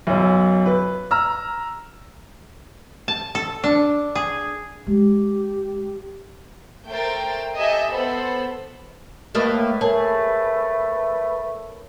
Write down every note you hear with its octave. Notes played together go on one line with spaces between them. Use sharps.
B1 F#2
B4
A#5 E6 F6
A5
A4
D4
G#4
G#3 G4
A3 A#4 C5 G5 A6
G4 A4 D#5 E5 G#5
B3 A4 C5 B5
A2 A3 A#3 B4 D#5
A3 G#4 A#4 C#5 A5